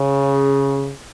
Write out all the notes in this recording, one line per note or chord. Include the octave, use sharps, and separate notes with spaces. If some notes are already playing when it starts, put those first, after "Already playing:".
Already playing: C#3